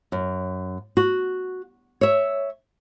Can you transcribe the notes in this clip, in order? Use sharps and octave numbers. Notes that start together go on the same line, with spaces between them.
F#2
F#4
C#5 E5